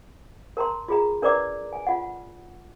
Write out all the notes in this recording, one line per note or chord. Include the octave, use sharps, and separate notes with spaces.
A#4 A5 A#5 C6
F4 G#4 A#5
D4 A#4 B4 D5 A#5 D6
G#5
F4 F#5